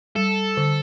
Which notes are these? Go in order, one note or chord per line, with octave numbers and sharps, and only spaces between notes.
G3 A4
D3